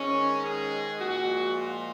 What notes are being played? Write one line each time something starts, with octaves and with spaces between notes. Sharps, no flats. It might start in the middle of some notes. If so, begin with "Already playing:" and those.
Already playing: G#2 D#3 G#3 C#4
G#4
A#2 F3 G#3 F#4
F4